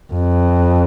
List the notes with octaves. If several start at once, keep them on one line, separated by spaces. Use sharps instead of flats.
F2